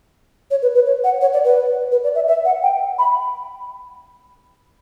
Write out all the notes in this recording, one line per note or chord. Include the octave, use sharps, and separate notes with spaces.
C#5
B4
B4
C#5
F#5
C#5
D5
B4
B4
D5
E5
E5
F#5
G5
B5